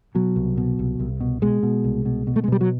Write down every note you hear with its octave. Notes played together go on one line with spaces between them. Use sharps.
B2 F#3
C2
B2
C2
C2
B2
B2 G#3
B2
C2
B2
B2
A3
G#3
B2 G3
F#3